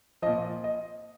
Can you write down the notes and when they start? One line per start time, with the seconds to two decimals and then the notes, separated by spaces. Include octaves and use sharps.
0.22 A#2 F3 D#5
0.64 D#5